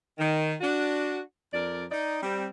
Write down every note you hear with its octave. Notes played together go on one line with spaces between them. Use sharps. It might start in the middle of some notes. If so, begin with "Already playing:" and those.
D#3
D4 F#4
F2 A#4 D5
D#4 D5
G3 C4